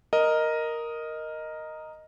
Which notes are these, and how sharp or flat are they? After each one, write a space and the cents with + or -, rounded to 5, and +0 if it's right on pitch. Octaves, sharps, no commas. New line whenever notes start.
A#4 +0 D#5 +0